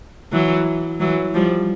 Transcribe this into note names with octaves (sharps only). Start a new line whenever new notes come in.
E3 F#3
E3 F#3
F3 G3